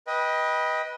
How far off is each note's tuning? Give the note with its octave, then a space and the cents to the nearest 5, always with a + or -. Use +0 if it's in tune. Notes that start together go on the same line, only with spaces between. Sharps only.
B4 -15 D#5 +15 G5 +10